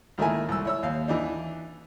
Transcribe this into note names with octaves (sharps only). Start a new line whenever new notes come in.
C#2 D#3 A3 A#3 E4 G#5
C2 E6
E4 C#5 E6
D#2 F5
E3 D4 D#4